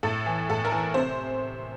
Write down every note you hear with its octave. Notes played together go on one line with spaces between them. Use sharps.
A2 A4
E3
A2 A4
A#4
E3
C3 C5